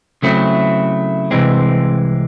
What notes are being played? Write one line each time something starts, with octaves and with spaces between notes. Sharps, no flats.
C#3 F#3 A3 C4 E4
C2 C3 E3 G#3 C4